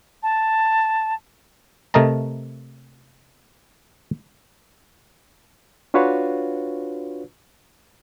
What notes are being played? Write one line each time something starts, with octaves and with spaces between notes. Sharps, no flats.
A5
C3 A3 A#4 D#5 A5 A#5
D4 F4 F#4 B4 C#5 F5